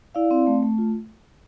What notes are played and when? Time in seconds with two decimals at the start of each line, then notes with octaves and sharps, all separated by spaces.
0.15 E4 D5 F5
0.31 C4
0.47 A3
0.63 A3
0.78 F4